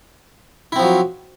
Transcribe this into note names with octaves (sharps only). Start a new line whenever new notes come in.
F3 F#3 C4 E4